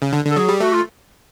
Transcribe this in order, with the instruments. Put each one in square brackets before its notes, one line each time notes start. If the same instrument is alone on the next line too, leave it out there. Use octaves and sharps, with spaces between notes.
[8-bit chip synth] C#3
D3
D3
[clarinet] A4
[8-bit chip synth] F#3 [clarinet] G#4
[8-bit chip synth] G3
[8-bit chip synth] A3 [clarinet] F#4
[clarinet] F4